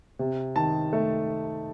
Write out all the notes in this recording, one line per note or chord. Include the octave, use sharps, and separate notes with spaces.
C3
D#3 A5
A3